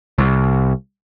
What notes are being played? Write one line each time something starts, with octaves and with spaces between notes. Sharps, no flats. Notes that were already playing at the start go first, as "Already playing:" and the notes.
C2